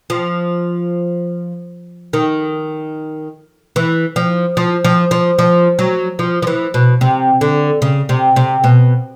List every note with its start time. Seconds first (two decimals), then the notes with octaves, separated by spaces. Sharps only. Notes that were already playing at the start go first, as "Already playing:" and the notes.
0.10 F3
2.13 D#3
3.76 E3
4.16 F3
4.57 F3
4.85 F3
5.11 F3
5.39 F3
5.79 F#3
6.19 F3
6.42 F3
6.47 E3
6.74 B2
7.01 C3
7.41 D3
7.82 C#3
8.09 C3
8.36 C3
8.64 B2